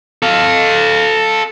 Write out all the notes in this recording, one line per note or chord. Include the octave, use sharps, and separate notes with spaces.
A4 F5